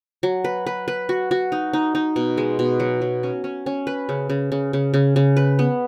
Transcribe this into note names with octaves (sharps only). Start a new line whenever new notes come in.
F#3
B4
B4
B4
F#4
F#4
D#4
D#4
D#4
B2
G#3
B2
F#3
F#3
C#4
C#4
C#4
B4
C#3
C#3
C#3
C#3
C#3
C#3
B4
B3